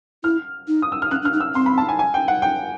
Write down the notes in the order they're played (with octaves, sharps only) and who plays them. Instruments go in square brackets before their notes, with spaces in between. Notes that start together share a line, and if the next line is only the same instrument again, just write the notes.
[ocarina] E4 [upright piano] F6
[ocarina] D#4
[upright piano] D#6
E6
F6
[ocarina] C#4 [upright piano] F#6
[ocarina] D4
[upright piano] F6
[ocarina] D#4
[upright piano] E6
[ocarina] C4 [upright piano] C6
[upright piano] B5
A5
G#5
G#5
G5
F#5
G5